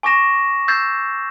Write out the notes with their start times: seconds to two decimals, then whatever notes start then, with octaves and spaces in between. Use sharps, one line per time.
0.03 G#5 C#6 D6 A#6 E7
0.68 E6 G6 A6 C7 E7